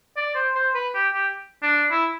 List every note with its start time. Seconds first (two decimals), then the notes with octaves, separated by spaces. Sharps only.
0.16 D5
0.35 C5
0.55 C5
0.74 B4
0.94 G4
1.14 G4
1.62 D4
1.91 E4